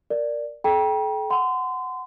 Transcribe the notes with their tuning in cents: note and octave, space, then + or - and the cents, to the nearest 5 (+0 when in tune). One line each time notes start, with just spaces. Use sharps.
A#4 +0 D5 +0
A4 -40 G5 +0 A#5 +45
F#5 +0 C6 -30